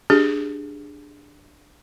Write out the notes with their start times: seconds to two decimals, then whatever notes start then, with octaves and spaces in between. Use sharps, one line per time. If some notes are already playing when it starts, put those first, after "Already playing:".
0.10 D4 G4 G#4